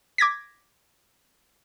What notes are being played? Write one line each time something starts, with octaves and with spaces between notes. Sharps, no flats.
D6 G#6 A#6 B6